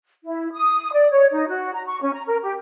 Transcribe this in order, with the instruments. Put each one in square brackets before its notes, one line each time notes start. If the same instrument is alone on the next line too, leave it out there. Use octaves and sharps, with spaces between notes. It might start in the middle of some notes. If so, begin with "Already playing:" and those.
[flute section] E4
D#6
D5
C#5
D#4
F#4
A#5
C#6
C#4
A#5
A#4
G4